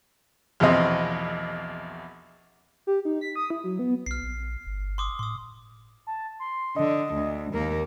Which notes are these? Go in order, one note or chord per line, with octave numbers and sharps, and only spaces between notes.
A#1 E2 B2 C4 D#5
G4
D#4
B6
D#6
E4
F#3
B3
B1 F6 C7
A#1
G1
C6 D6 D#6
A2 C6 D#6
A5
C6
D3 D#5
D2
D#2 A#3 A#4